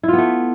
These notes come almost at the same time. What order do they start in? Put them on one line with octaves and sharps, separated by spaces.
E4 F4 B3 A3